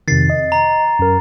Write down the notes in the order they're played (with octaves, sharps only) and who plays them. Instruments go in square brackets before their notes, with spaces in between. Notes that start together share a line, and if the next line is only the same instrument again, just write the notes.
[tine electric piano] F2 C3 D#3 [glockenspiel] A6 C7
[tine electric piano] D#5
[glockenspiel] A#5
[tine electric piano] F#2 A#4